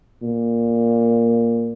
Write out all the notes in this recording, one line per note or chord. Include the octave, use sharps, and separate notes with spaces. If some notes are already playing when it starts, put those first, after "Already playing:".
A#2